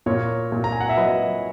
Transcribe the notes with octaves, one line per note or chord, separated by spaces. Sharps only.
A#2 A#4 C#5
A#2
A#5
G#5
F#5
E5
F#3 B4 D#5